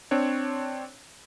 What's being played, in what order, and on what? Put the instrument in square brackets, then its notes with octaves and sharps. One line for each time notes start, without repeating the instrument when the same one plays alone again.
[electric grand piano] C4 D4 C#5